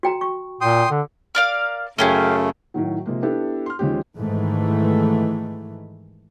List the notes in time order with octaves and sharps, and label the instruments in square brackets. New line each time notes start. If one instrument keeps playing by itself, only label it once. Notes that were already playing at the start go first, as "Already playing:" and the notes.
[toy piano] F#4 G5 A#5
C#6
[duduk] A#2 [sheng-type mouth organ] G5 C6 D#6
[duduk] D3
[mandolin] A#4 D5 F5
[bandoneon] F#2 C#3 A3 [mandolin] C#4 G4 G#4
[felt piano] A2 D#3 F#3
C3 F3 G#3 A#3
B3 D4 E4 G4 A4
C6 F6
D#2 F3 G#3 C#4 G4
[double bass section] G#2 D#3 E3 A3